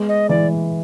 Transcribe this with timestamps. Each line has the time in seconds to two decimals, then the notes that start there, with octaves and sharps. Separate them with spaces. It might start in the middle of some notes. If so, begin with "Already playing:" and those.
Already playing: G#3 B3
0.09 D#5
0.29 E3 D5